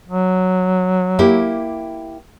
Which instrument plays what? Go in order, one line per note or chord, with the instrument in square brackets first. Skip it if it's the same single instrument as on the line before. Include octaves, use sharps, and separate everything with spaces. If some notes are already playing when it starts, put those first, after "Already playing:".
[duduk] F#3
[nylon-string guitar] A#3 E4 G4